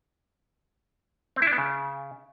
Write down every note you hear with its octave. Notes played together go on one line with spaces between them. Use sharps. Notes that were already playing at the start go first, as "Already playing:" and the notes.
C4
E4
D4
B3
C#3